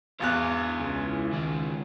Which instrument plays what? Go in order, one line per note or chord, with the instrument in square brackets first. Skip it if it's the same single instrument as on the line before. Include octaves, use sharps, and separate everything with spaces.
[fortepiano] G#1 E2 F#6 [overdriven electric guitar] E4 F5
[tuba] C#2
[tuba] C#2 [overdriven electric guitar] D#3 G#4